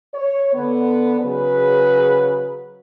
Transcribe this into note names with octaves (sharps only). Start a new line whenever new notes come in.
C#5
D3 B3
C#3 F#3 G#4 B4